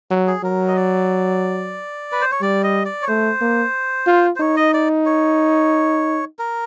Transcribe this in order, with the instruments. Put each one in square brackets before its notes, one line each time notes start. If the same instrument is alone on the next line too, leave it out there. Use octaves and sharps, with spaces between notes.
[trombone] F#3
[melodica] G#4
[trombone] F#3 [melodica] A#4
[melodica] D#5
D5
B4
C5
C#5
[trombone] G3 [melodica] D5
[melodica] D#5
D5
C#5
[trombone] A3 [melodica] C5
[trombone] A#3
F4
[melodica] C5
[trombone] D#4 [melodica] C#5
[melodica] D#5
D5
C#5
A#4